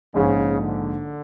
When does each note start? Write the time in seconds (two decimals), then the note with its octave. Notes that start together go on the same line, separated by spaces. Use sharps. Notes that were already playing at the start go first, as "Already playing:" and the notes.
0.14 A#1 G#2 C#3 F3 G#3
0.61 D3